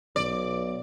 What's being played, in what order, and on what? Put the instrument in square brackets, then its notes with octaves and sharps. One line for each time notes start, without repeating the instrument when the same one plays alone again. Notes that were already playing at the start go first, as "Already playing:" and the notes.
[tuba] B1 [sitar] D5